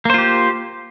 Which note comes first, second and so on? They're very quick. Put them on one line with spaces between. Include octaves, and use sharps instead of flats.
A#3 C5 F4 G4